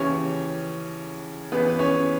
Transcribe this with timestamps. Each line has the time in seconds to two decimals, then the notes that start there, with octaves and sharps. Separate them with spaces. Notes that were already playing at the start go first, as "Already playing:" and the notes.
Already playing: D#2 C#3 E3 C#4 C#5
1.52 C#2 C#3 E3 B3 B4
1.68 B4
1.79 C#4 C#5